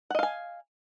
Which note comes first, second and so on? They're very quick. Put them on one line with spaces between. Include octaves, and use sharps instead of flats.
F#5 D#5 F5 G#5